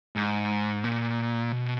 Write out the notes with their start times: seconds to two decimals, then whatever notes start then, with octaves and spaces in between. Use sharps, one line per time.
0.16 G#2
0.84 A#2
1.52 B2